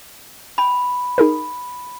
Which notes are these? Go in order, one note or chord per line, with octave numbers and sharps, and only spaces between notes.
G5 B5
D#4 G#4 A#4